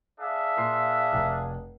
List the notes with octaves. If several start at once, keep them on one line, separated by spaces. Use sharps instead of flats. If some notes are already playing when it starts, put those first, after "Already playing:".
D4 G#4 E5 F5
A#2 C6 C7
F1 G5 A#5